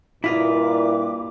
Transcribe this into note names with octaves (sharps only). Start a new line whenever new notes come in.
G2 A#2 E4 F4 D#5 D6